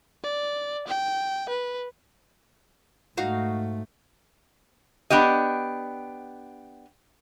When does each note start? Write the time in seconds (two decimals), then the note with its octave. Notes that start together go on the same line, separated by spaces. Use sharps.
0.24 D5
0.87 G5
1.49 B4
3.17 G#2 A3 D#4 F#4 F5
5.10 B3 D4 G4 D#5